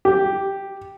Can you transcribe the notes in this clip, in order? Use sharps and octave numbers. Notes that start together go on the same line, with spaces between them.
G4